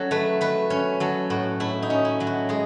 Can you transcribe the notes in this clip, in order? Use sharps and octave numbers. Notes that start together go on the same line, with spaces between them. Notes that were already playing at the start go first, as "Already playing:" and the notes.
Already playing: F#3 C#4 A4
A3 B4
A3 B4
C#4 C#5
F#3 A4
A2 F#4
A3 E4
D#4
C#4
E4
F#3
F#4
G#3 G#4